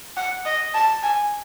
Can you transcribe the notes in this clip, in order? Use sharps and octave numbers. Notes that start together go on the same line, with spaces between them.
F#5
D#5
A5
G#5